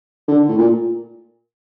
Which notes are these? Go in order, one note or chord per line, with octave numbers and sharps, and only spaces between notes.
D3
A2
A#2